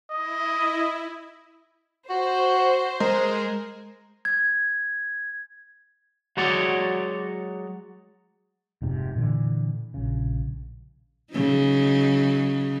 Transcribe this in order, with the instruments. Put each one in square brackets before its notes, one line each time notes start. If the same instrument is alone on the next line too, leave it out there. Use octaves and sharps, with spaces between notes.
[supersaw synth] E4 [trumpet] D#5
[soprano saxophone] F#4 [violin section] C5
[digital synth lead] G#3 [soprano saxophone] A#4
[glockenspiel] G#6
[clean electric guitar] F#3 G#3 F#4 C#5 D5
[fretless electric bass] F1 G#2 C3
A#2 D3 E3
A#1 C#3
[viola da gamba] C#3 F#3 D#4